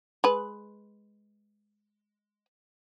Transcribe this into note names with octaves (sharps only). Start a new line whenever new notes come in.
G#3 B4